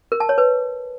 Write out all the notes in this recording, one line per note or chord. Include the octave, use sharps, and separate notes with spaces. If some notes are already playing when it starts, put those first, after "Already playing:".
A#4
A5
C#5
B4